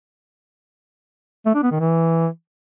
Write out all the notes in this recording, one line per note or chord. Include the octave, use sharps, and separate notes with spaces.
A3
D4
B3
D#3
E3